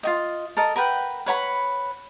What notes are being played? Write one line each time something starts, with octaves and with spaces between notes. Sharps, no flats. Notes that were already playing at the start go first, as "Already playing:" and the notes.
F4 F#4 D#5
A4 A#4 D#5
A#4 B4 F#5 G5
B4 C#5 F#5 B5